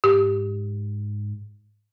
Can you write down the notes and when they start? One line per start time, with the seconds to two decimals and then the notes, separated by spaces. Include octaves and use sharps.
0.04 G#2 G4